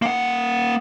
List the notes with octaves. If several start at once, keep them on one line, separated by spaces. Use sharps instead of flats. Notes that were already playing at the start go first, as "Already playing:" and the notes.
A#3 F#5